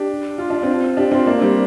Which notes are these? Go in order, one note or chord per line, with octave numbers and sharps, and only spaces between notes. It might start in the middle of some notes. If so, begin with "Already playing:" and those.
Already playing: D4 G4
F4
D4
C4 F4
D4 G4
C4 F4
A#3 D4
G3 C4